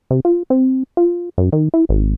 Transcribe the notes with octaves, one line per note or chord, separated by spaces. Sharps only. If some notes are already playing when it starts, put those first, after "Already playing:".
C3
F4
C4
F4
F#2
D#3
E4
G#1